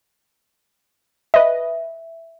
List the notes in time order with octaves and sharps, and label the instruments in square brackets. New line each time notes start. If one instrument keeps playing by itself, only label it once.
[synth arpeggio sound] B4 D#5 [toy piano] E5